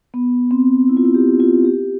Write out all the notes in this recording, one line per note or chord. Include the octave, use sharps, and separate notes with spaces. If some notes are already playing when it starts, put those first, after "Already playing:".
B3
C4
E4
F4
E4
G4
F4
G4